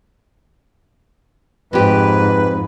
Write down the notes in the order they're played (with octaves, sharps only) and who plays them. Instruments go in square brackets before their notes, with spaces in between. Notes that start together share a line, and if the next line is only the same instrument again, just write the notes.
[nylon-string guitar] F2 G4 [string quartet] G#2 [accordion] B4